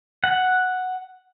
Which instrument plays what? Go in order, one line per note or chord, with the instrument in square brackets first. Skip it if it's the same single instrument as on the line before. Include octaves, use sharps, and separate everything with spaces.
[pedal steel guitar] F#5